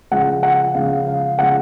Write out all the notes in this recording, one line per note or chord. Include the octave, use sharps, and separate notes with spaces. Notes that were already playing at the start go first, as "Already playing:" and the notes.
C#3 F3 G#3 F#5
F#5
C#3 F3 G#3 F5
F5
C#3 F3 G#3 F#5